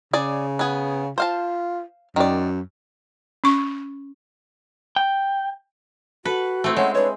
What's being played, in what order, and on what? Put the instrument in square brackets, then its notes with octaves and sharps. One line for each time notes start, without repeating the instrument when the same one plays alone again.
[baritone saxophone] C#3 [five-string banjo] G#4 D5
[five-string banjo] B3 G#4
[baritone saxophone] F4 [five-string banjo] C5 F5 A5
[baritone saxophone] F#2 [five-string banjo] D#3 D5
[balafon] C#4 C#6
[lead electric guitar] G5
[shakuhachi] F#4 [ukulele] A4 [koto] B4
[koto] A3 C4 E4
[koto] G#3 [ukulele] C#4 C#5 [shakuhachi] F#5
[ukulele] D4 C#5 [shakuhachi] B4